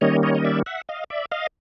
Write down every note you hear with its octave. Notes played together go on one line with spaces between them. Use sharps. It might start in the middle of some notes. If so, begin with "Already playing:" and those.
D#3 G3 A#3 C#4 C#5 D#5
C#5 D#5
D#5
D5 E5
E5 F#5
D#5 F5
D5 E5
D#5 F5